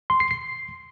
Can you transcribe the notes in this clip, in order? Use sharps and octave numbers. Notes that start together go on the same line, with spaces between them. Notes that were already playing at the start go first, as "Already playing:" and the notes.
C6
C7
C7